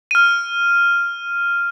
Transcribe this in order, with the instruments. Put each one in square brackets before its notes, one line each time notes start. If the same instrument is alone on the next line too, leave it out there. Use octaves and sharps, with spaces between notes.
[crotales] F6 D#7